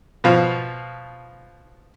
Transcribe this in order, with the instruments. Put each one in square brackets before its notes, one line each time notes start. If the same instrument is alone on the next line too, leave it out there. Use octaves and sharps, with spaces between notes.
[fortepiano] B2 F3 F5